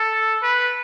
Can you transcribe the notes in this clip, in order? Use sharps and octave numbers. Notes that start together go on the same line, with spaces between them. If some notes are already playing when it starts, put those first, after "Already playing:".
Already playing: A4
B4